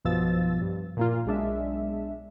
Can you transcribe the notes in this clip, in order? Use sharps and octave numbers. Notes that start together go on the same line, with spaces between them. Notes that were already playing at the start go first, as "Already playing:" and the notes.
B1 G2 B2 F3 E6 A6
G2
A#2 A#3 F4
B1 G#3 D4 E5